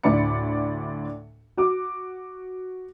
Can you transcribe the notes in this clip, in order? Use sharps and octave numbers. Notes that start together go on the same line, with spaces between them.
D2 A2 D5 B5 C#7
F#4 D6